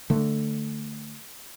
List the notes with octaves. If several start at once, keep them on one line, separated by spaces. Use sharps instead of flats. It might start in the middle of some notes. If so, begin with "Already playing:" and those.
D3 A3